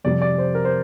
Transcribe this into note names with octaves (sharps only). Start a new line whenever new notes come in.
F2 C3 G3 D5
D5
C5
A#4
C5